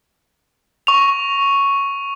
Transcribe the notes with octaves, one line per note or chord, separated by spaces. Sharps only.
C#6 F7